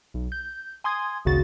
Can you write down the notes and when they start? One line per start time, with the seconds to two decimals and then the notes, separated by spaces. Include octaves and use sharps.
0.14 B1
0.32 G6
0.84 G#5 C6 D#6 G#6
1.25 G#1 D2 C#3 F#4 A6